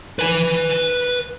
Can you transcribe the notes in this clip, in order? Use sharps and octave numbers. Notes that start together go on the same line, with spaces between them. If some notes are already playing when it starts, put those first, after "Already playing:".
B4 G#5